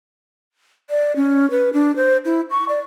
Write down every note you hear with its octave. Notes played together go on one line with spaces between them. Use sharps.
D5
C#4
B4
D4
C5
E4
C#6
D5